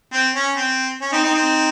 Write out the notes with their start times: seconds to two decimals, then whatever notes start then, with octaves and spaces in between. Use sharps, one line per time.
0.13 C4
0.35 C#4
0.57 C4
1.01 C#4
1.12 C4 D#4
1.24 C4 D#4
1.34 C4 D#4